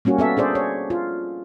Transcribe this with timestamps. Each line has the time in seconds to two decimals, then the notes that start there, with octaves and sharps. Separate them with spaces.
0.05 G3 A#3 C#4 F#4
0.18 B3 A4 E5
0.37 D4 G#4 C5 D5
0.55 C#5
0.90 F4